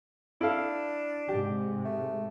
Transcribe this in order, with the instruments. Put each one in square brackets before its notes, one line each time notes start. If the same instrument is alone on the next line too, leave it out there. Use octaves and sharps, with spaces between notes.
[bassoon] D4 [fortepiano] E4 A4 F5
[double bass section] G#2 C3 G#3 [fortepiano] G4
[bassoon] A3